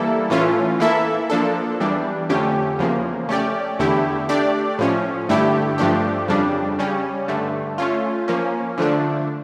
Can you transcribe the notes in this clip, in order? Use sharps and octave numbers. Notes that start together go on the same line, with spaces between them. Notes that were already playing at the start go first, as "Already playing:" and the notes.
Already playing: E3 G3 A#3 E4 A4
A2 E3 A3 C#4 F4
E3 A#3 E4 A4 E5
F3 A#3 D4 A4
E2 E3 G3 D4
F2 D3 A3 C#4 G4
E2 C#3 F3 A#3
A3 C#4 G4 D5
E2 D3 A3 E4 G4
A3 D4 G4 D5
A2 F3 C#4
G2 D3 A3 E4 G4
G2 F3 A3 D4 G4
F2 C#3 G3 D4
C#3 G3 C#4
G2 D3 A3
A3 C#4 F4
F3 A#3 C#4
D3 F3 A3 D4